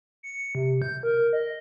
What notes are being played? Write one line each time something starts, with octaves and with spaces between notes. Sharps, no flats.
C#7
C3
G6
A#4
D#5